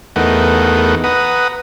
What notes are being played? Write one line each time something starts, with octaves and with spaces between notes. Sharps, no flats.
E2 A3 B3 D#4 A#4 F#5
B4 F#5 A#5 D#6